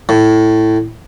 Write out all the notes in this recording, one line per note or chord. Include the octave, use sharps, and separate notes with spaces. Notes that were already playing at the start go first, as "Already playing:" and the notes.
A2